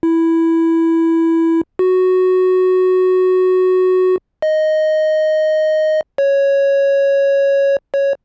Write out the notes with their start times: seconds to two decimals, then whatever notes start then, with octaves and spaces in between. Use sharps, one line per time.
0.03 E4
1.79 F#4
4.42 D#5
6.18 C#5
7.94 C#5